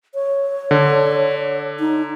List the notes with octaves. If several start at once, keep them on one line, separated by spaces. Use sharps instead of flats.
C#5
D3
D#4